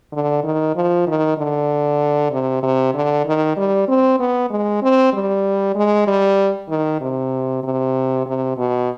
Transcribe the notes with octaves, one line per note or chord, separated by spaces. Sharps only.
D3
D#3
F3
D#3
D3
C3
C3
D3
D#3
G3
C4
B3
G#3
C4
G3
G#3
G3
D#3
C3
C3
C3
B2